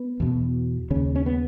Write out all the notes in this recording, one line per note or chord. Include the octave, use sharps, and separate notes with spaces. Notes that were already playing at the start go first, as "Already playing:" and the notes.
Already playing: B3
E2 B2
D#2 C#3 C#4
C#4
B3